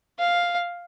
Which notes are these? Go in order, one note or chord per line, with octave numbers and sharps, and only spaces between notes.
F5